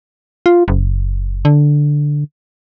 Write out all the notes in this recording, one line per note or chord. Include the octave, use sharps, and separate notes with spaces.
F4
F#1
D3